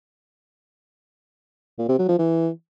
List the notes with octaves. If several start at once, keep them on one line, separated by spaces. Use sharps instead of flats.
A#2
C3
F#3
F3
E3